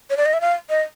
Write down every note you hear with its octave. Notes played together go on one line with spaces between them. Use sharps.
C#5
D5
D#5
E5
F5
D#5